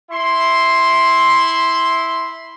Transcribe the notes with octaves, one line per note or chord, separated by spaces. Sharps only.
E4 C6